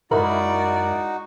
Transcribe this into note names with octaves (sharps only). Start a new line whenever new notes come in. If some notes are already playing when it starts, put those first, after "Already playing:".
F#2 G#3 D#4 E4 F#4 A#4 D5 B5